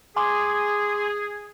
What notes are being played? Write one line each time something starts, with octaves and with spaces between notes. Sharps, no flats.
G#4 G#5 C6 D6